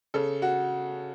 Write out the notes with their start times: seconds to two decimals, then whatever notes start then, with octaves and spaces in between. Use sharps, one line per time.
0.14 C#3 A4
0.42 F#4